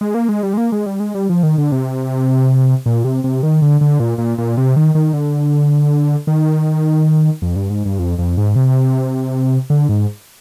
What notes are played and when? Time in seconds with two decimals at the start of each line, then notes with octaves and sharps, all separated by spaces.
0.01 G#3
0.14 A#3
0.29 G#3
0.43 G3
0.53 G#3
0.57 A#3
0.72 G#3
0.86 G3
1.00 G#3
1.15 G3
1.29 F3
1.43 D#3
1.58 D3
1.72 C3
2.86 A#2
3.04 C3
3.24 C3
3.43 D#3
3.62 D3
3.81 D3
4.00 A#2
4.18 A#2
4.38 A#2
4.57 C3
4.76 D#3
4.95 D#3
5.13 D3
6.27 D#3
7.42 F2
7.56 G2
7.70 G#2
7.85 G2
7.99 F2
8.18 F2
8.37 G#2
8.56 C3
9.70 D3
9.89 G#2